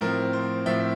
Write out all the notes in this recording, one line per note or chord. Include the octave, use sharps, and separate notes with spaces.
A2 F3 C4 A#4
C5
A2 F3 C4 E5